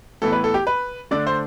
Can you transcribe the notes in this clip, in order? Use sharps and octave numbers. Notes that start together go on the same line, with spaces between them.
A2 E3 B3 E4 A4
B4
A4
G4
B4
D3 A3 D4 D5
C5